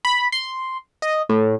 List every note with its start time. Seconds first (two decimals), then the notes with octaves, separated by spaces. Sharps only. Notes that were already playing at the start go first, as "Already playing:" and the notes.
0.05 B5
0.32 C6
1.02 D#5
1.29 A2